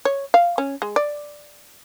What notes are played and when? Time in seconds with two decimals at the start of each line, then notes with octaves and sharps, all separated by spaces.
0.05 C#5
0.34 F5
0.58 C#4
0.82 G#3
0.96 D5